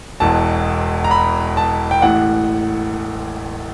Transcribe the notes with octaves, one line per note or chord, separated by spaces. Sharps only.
E1 E2 B2 A5
A#5
B5
A5
G5
A1 A2 E3 F#5